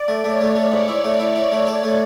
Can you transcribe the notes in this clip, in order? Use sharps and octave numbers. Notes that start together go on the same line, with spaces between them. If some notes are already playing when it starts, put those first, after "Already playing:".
Already playing: D5
A3
A3 C#5
A3
A3
G#2
E4
A3
E4
E4
A3
A4
A3